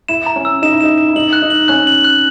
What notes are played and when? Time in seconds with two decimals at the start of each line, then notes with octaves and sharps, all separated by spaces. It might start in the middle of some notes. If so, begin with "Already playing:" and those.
0.09 E4 E7
0.26 A#5
0.36 C#4
0.45 E6
0.62 D#4 E7
0.72 E4
0.81 D#4 E7
0.98 E7
1.08 E4
1.16 D#4 F#7
1.33 F#6
1.42 D#4
1.50 F#7
1.68 C#4 F#6
1.87 F#7
2.04 F#6